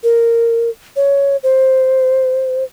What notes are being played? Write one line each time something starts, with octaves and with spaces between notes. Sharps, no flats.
A#4
C#5
C5